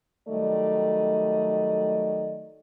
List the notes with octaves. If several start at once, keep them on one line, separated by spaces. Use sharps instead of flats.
D#3 F#3 G3 A3 D5 D#5